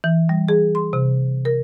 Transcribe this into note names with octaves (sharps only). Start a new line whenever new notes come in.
E3
G3
G#4
C6
C3
A#4